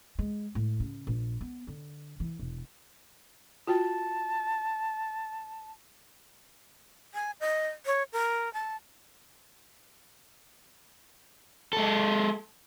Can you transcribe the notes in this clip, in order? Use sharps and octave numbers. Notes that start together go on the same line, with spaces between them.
G#3
A2
C#3
A#1
B3
D3
E3
E1
F4 F#4 G5 A5
G#5
D#5
C#5
A#4
A5
G#3 A4